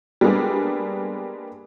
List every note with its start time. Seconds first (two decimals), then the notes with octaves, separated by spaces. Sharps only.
0.21 G3 G#3 A#3 B3 D4 G#4